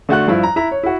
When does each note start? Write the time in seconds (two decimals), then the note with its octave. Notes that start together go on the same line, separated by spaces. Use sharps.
0.09 D3 A3 F#4 F#6
0.28 G2 F3 E4
0.43 A#5
0.56 E4 E5 A#5
0.71 C#5
0.83 E4 F#4